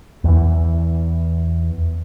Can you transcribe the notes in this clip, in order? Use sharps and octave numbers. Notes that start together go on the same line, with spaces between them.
E2 E3